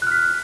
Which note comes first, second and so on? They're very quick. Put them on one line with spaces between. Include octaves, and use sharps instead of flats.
F#6 F6 B6